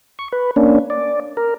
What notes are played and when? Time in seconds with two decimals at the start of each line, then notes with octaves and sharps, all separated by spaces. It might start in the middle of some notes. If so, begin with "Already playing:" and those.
0.19 C#6
0.32 B4
0.56 A#3 C#4 D4
0.90 D5
1.37 A#4